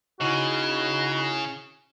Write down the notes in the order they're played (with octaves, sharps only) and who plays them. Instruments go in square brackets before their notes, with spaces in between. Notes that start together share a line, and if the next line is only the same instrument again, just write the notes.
[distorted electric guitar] C#3 [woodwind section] D#4 E4 F#4